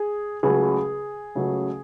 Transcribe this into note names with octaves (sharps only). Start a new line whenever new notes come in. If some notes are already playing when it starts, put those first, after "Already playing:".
Already playing: G#4
C#2 C#3 F#3 A3 G#4
C#2 C#3 F#3 A3